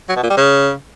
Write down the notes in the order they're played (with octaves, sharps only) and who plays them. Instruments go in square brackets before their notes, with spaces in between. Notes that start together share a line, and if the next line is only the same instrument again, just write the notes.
[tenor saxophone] F#3
B2
A#2
G3
C#3